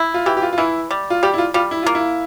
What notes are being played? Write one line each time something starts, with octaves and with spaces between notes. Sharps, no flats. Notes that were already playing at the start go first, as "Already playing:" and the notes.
Already playing: E4
F4
E3 G4
G4
F4
F4
E3 E4
G3
F4
G3 G4
E4
F4
G3 F4
E4
A#3 F4
E4